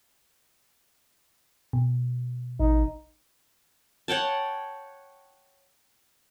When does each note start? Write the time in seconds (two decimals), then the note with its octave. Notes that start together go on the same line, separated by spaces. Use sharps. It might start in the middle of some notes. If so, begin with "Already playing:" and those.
1.73 B2
2.60 A1 D#4
4.08 C#5 F#5 G5 A5